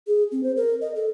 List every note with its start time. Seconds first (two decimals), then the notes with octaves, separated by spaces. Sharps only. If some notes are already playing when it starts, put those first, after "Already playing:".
0.07 G#4
0.32 C4
0.43 C5
0.56 A#4
0.81 D#5
0.95 A4